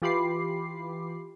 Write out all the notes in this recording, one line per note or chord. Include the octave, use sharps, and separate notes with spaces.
E3 F4 G4 B5 D6 C7